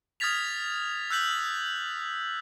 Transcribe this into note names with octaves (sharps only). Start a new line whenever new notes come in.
D#6 F6 G#6 A6 B6 F7
E6 F#6 G6 B6 F#7